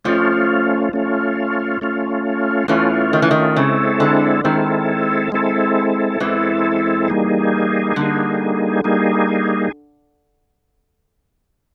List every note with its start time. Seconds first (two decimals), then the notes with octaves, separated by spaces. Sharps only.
0.05 F2 F3 A3 C#4 F4
0.93 A3 C#4 F4
1.81 A3 C#4 F4
2.68 E2 E3 A3 C#4 F4
3.13 D#3
3.22 E3
3.31 D#3
3.56 C#3 G#3 C4 E4 A4
4.00 D3
4.44 D#3 G#3 C4 E4 A4
5.32 G#3 C4 E4 A4
6.20 E2 E3 G#3 C4 E4 A4
7.08 G3 A#3 D#4 G#4
7.96 D3 G3 A#3 D#4 G#4
8.84 G3 A#3 D#4 G#4